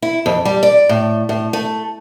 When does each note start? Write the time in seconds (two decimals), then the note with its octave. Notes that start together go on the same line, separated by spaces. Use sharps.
0.02 E4
0.26 F2
0.45 G3
0.63 D5
0.89 A2
1.29 A2
1.53 A3